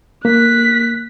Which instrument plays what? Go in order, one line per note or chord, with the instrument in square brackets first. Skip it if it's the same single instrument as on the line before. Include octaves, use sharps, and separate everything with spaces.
[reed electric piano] A#3 [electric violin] F#6 B6